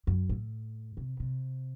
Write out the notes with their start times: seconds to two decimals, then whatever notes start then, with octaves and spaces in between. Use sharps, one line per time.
0.07 F#2
0.29 A2
0.97 C3
1.20 C3